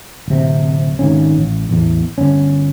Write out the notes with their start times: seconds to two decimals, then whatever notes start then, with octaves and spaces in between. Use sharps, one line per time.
0.28 D1 C3
0.99 G#1 D#3 C#4
1.38 A1
1.69 A1 E2
2.18 G1 C#4